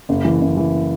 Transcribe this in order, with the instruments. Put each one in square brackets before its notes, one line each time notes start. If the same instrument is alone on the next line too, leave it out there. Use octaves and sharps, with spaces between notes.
[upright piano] F#1
E3
F#1
E3